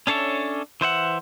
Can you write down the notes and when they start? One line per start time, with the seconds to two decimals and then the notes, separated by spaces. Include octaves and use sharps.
0.07 C#4 D4 A4 C#5 E5
0.81 E3 C5 E5 F#5